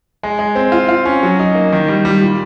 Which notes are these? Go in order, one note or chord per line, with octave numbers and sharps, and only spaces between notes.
G#3
G#3
C4
F4
F4
C#4
F#3
D#4
A#3
D#3
G3
G3
A#2